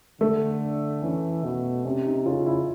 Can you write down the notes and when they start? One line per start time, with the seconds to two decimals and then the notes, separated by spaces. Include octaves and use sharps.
0.20 D3 A3
1.02 E3 C#4
1.44 B2
1.85 C3 C#4
2.06 D#4
2.26 C#3 F4
2.46 E4